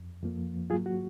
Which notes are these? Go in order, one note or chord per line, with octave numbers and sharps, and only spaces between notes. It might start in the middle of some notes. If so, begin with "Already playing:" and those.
Already playing: F2
F2 F3 A#3
G#2 F#3 A#3 F4 G#4
F#4